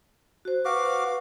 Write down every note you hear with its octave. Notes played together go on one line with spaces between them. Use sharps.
F#4 C5
F#4 B4 F5 D6